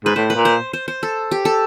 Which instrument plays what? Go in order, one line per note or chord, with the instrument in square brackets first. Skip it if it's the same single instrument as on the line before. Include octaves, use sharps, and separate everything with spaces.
[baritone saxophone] G#2 [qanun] B4
[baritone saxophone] A2 [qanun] C5
[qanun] B4
[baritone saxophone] A#2
[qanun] C5
C5
C5
A4
G4
A4